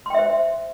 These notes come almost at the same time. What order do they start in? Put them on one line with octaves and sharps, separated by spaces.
C6 G5 E5 C5